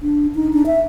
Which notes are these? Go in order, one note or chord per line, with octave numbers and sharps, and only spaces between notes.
D4
D#4
D4
E5